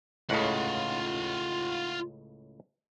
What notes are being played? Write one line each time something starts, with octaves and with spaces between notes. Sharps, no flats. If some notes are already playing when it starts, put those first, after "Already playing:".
C#2 A2 C#3 F4 F#5